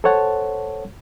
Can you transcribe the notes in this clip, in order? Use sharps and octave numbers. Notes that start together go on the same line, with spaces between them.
A4 C5 C#5 F#5 A5